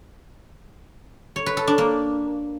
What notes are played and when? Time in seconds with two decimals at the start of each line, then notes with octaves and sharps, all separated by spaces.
1.36 C#5
1.46 B4
1.57 A4
1.67 D4
1.78 A#3